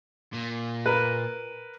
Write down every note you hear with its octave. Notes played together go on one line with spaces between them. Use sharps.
A#2
A#4 B4